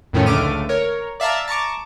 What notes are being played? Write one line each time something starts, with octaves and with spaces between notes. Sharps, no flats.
F2 A2 D#3 F3 A3 C#4
C#2 D3 A3 D6 F6 D#7
A#4 C#5
D5 E5 F5 A5 A#5
A5 A#5 C#6 D6